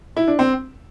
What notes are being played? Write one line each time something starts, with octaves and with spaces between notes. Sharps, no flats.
E4
D4
C4